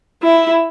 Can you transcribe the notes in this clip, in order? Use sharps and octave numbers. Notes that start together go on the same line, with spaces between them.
E4